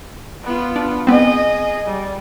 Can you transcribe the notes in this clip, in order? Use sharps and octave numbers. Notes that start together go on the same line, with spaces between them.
B3 F4
D4
B3 C4 G#4 D#5
G3